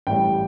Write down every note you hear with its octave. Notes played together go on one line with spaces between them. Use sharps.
A1 A2 G3 G5